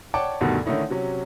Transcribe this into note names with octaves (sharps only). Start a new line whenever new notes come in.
C#5 D5 F#5 G5 A5 D6
D2 G2 B2 D#3
D3 D#3 A3 C#4 D#4 E4
C3 F#3 C#4